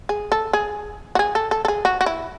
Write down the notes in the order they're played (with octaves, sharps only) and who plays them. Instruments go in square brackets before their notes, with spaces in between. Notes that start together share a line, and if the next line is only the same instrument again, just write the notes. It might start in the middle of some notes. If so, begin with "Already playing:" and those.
[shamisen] G#4
A4
G#4
F#4
G#4
A4
A4
A4
G#4
F#4
F#4
E4